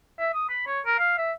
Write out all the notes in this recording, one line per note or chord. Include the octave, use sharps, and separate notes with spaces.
E5
D#6
B5
C#5
A#4
F5
E5